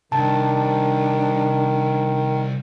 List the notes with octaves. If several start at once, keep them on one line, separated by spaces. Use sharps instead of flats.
C2 D#3 D4 A5